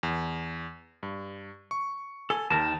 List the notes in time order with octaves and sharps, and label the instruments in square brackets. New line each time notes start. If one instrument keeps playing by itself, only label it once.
[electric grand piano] E2
G2
C#6
[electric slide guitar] A4 [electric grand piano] G#5
[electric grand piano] D#2 [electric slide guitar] D#3 A#4 A5